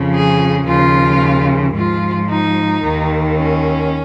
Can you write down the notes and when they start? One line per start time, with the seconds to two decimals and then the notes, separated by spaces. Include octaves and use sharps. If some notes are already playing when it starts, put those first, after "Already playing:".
Already playing: F2 C#3 F3
0.13 G#4
0.67 D#2 C#3 F3 F4
1.75 G#2 F3 F4
2.28 D#4
2.82 D#2 D#3
3.36 C#4